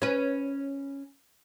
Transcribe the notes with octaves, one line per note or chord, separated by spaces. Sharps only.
C#4 B4